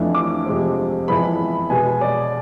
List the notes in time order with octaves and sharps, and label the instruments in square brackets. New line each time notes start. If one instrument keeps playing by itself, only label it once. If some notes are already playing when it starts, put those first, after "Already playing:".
Already playing: [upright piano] F2 E3 A3 D4
D6
F2 C3 G#3 C4
F2 E3 G#3 B3 B5
B2 G#3 B3 G#5
D5